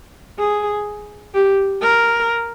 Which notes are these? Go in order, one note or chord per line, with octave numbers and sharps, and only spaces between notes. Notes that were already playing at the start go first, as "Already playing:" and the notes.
G#4
G4
A#4